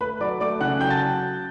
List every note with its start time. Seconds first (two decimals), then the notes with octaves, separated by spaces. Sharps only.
0.01 A3 B4 B5
0.21 F#3 D5 D6
0.40 A3 D5 D6
0.60 C#3 F#5 F#6
0.80 F#3 G5 G6
0.90 A5 A6